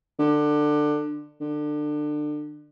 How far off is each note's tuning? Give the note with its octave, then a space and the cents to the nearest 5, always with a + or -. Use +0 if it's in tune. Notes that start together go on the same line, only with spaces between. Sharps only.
D3 +20
D3 +25